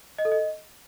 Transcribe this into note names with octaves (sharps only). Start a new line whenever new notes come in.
D#5
A4
D#5